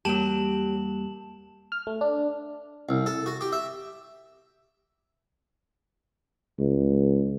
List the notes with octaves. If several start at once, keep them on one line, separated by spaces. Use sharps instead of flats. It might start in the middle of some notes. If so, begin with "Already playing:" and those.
E2 F#3 G3 A#3 G4 A5 E7 F#7
F6
A3
D4
C2
A4
F#4
G4
E5
C#2